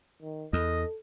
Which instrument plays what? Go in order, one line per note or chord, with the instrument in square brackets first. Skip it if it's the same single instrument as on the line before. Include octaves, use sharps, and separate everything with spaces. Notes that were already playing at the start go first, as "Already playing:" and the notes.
[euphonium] D#3
[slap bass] E2 [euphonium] A4 [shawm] D#5